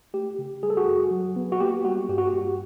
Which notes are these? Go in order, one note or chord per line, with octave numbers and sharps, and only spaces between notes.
A3 G4
C#3
G3 G#4
A4
F#4 G#4
F#2
F#3
B3
F#4
A#3 G4
G3 F#4
G2 G4
F#4
G4
G2